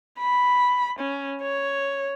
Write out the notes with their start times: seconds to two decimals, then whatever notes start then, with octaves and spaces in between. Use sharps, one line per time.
0.19 B5
0.99 C#4
1.42 C#5